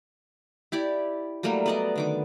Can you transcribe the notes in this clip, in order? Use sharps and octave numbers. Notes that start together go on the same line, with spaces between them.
E4 G4 D5
F#3 G3 A3 A#3
B3 D5 D#5
D3 D#3 D6